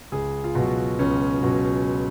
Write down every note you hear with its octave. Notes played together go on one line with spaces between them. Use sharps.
C#2 G#4
F4
B2 F#3 F#4
C#2 C#4
B2 F#3